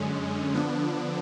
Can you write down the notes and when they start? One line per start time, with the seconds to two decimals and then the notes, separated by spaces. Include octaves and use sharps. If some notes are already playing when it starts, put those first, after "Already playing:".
Already playing: F#2 D3 G#3 C#4
0.54 D3 F3 B3 D4